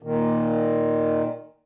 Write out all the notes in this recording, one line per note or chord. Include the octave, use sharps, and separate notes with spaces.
A#2 D#3